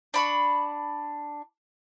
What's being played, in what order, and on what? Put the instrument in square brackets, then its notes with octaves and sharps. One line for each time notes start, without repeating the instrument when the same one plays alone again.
[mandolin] D4 B5 C#6